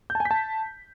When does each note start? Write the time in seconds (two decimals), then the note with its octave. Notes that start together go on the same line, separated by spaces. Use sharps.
0.10 G6
0.15 A5
0.20 G#5
0.25 B6
0.31 A5